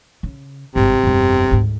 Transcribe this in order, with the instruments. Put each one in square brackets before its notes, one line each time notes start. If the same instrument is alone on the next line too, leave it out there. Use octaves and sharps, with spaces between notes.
[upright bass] C#3
[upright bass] G#1 G2 [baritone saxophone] C3
[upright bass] G1 F2
D2 G#2